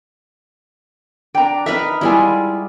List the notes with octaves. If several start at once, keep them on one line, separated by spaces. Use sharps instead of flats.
D4 G5 A#5
D#4 A#4 B4 E5
G3 G#3 E4 F4 E5 G#5